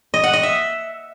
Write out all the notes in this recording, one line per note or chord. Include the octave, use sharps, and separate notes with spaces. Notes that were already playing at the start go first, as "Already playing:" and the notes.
D#5
F#5
D#5
E5